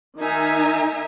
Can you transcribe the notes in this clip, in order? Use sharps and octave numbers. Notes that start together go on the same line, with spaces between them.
D#3 D#4 E5 G#5 A#5